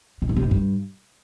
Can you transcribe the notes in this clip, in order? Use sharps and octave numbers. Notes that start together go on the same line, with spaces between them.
B2
A2
C3
G#2
G2